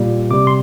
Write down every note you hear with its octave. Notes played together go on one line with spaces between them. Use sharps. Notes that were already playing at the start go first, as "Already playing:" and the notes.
Already playing: A#2 G3
C3 G3 D6
C6